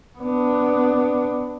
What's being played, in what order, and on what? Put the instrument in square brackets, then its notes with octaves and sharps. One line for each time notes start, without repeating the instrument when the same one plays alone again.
[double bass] B3 D4